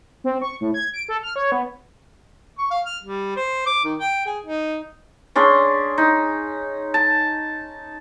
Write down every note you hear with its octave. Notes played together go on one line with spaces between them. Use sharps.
C4
C#6
A2
G#6
D7
A4
F6
C#5
B3
C#6
F5
F6
G3
C5
D6
D#3
G5
G#4
D#4
C#4 D4 G#4 C6
D#4
A5